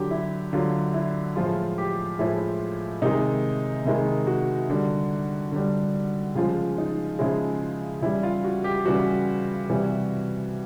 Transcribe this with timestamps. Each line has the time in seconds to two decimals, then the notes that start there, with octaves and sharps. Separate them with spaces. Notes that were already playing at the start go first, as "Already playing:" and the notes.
Already playing: D3 F#3 G4
0.11 E4
0.53 D3 F#3 F4
0.94 E4
1.36 A2 F3 G#3 F4
1.78 G4
2.19 A2 F3 G#3 E4
3.02 C3 D#3 G#3 D#4
3.85 C3 D#3 G#3 E4
4.27 F#4
4.70 D3 G3
5.52 D3 G3
6.35 C#3 F3 G#3 F4
6.78 D#4
7.19 C#3 F3 G#3 E4
8.02 C#3 E3 G3 E4
8.23 F4
8.44 F#4
8.64 G4
8.85 C#3 E3 G3 F#4
9.70 C3 E3 G3